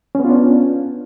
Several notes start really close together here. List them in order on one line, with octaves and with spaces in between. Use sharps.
C#4 B3 F4 D4